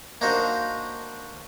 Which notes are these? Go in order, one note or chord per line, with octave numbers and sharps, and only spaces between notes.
A#3 D4 D#4 F#4 A#4 C5